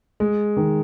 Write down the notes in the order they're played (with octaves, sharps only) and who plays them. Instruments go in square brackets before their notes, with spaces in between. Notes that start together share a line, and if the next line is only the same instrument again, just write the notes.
[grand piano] G#3
D#3